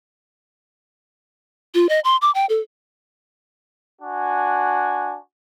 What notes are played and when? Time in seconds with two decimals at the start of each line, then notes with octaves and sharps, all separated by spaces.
1.75 F4
1.89 D#5
2.04 C6
2.22 D6
2.35 G5
2.49 A4
4.02 D4 F#4 G#5